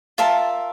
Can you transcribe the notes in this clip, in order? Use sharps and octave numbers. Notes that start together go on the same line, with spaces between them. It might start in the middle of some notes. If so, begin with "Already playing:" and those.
F4 A#4 E5 A5